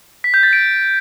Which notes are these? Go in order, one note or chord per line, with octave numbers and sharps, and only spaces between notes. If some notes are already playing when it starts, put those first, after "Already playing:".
B6
G6
A6
D7